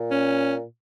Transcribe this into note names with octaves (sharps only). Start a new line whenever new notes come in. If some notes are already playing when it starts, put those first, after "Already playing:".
Already playing: A#2
C#4